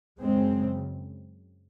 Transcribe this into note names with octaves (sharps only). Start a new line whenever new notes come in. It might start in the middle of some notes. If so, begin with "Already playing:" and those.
F#2 C#3 G#3 C4